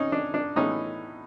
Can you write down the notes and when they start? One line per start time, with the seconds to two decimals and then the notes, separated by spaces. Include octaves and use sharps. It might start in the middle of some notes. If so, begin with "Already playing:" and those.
Already playing: C#4 D#4
0.12 D4
0.34 D4
0.56 A2 E3 G#3 B3 C#4 D#4